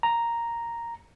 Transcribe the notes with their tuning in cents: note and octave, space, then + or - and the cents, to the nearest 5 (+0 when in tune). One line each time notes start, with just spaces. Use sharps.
A#5 +0